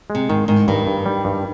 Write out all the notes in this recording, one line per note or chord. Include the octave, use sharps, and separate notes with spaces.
G#3
C3
G#2 D#3
G#2 D#3
G2 D#3
G2
G3
G2